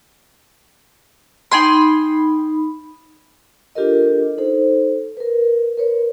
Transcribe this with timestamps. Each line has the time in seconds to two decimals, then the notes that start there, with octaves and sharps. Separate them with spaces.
1.52 D#4 G5 G#5 B5 C6
3.75 D4 F4 G4 A4 A#4 D#5
4.38 D#4 A4 C5
5.17 A#4 B4
5.78 A#4 B4 C#5